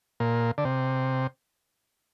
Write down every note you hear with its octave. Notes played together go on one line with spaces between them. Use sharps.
A#2
D3
C3